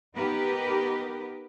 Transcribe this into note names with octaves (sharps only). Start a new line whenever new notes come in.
B3 D#4 G4 A#4 B4